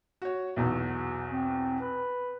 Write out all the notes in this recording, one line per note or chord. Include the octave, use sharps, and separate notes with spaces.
F#4 C#5
B1 E2 B2
C4
B4